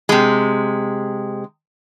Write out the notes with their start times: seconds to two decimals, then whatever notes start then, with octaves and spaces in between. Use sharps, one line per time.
0.09 C3 G#3